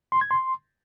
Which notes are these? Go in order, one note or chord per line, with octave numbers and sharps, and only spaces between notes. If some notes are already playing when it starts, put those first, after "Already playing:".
C6
G#6
C6